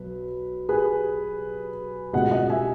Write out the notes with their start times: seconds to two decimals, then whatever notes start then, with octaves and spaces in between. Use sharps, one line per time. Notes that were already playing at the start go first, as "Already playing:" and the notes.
Already playing: B1 B4
0.69 G#4 B4
2.13 C#2 B2 D#5 F#5
2.31 D#5 F#5
2.50 E5 G#5